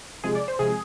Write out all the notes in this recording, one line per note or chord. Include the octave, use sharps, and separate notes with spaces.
C3 F3 G#3 G#4
D5
C5
C3 F3 G#3 G#4